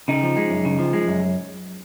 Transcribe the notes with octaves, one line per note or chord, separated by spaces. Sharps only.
C#3 D#4
F3
G#3
F#2
C#3
F3
G#3
F#2